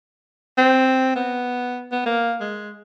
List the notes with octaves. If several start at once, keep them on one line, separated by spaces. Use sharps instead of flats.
C4
B3
B3
A#3
G#3